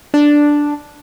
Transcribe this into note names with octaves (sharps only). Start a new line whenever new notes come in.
D4